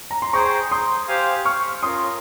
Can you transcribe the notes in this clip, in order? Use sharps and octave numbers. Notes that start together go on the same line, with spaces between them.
A#5
C6
G#4 C5 G5 A#5 C#6
C6 D#6
G4 C5 F5 G#5
C#6 F6
C#4 F4 A#4 C6 D#6